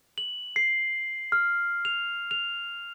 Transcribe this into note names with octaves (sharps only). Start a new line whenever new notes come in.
F#7
C7
F6
F7
F7